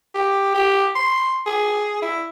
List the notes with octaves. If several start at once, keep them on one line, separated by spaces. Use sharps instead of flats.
G4
G4
C6
G#4
E4